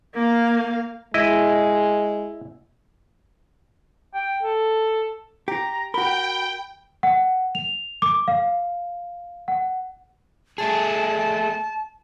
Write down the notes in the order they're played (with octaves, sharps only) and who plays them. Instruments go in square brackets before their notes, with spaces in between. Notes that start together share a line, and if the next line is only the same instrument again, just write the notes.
[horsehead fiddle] A#3 F5
[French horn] G#3 [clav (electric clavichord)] E4 D#5
[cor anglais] G5
A4
[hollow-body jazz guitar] G4 [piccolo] A#5
[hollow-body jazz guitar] F#4 A#4 [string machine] G5 [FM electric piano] B5 [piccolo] G7
[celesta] F#5
F7
D6
F5
F#5
[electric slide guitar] A3 G#4 [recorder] A5